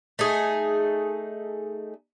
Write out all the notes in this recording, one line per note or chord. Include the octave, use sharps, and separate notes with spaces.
A3 D#4 G#4